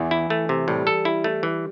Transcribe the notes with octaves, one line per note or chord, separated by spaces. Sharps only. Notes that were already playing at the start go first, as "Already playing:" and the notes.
Already playing: E2 E3
E4
A3
C3
A2 G3
A4
E4
A3
E3